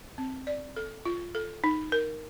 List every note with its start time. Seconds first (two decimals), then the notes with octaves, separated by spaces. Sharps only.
0.18 C4
0.47 D5
0.76 A4
1.05 F4
1.35 A4
1.64 D#4
1.92 A#4